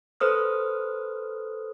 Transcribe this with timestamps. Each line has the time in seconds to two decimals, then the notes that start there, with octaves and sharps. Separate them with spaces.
0.20 A4 B4 C5 D#6 F6